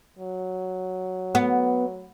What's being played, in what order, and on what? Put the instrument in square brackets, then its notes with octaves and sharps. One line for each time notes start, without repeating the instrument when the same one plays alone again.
[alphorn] F#3
[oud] B3